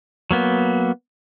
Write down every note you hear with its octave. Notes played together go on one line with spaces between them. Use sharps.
F#3 A#3 B3